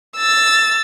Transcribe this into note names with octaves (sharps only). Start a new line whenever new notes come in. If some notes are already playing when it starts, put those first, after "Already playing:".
E6 A6